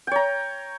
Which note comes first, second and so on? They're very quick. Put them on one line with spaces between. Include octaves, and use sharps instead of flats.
G5 C#5 A#5